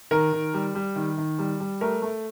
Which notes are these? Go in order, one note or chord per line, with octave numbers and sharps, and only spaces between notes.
D#3 A#4
D#3
G3
G3
D#3
D#3
G3
G3
A3 A#4
A3